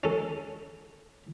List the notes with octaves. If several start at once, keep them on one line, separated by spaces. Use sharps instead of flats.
C#4 A4